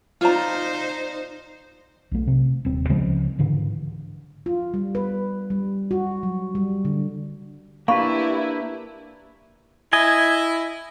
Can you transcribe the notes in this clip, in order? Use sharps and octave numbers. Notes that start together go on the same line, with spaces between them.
D#4 F4 C5 D5 A#5
B1 A3
C3
D#1 C4
C#2 C#3 F3 G#3
G#2 D3 E3
F4
G3
B4
G3
F#4
F#3
G3
D3
A#3 D4 E4 G4 B4 F5 B5 C#6
E4 D#5 G#5